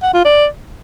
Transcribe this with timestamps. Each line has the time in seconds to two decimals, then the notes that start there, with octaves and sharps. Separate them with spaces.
0.03 F#5
0.14 F4
0.25 D5